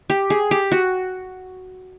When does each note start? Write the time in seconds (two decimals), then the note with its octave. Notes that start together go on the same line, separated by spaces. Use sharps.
0.10 G4
0.30 G#4
0.51 G4
0.72 F#4